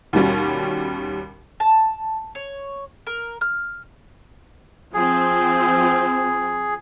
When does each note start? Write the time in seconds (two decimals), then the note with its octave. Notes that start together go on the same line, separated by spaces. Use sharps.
0.13 D#2 B2 G3 C#4
1.60 A5
2.35 C#5
3.07 A#4
3.41 F6
4.94 F3 C4 G#4